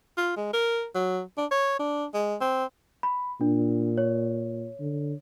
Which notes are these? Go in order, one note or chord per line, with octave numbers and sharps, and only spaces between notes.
F4
G#3
A#4
F#3
D4
C#5
D4
G#3
C4
B5
A#2 D4
C#5
D3